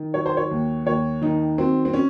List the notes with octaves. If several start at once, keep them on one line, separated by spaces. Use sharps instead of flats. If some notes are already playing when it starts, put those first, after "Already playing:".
Already playing: D#3
F#3 C#5
C5
C#5
D#2
D#2 C#5
D#3 D#4
F#3 C4
C4
C#4